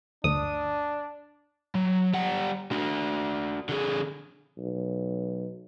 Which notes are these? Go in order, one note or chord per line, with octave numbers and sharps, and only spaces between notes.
G1 D2 D4 D#6
F#3
G3 F#5
D4 F#4
D3 G#4
B1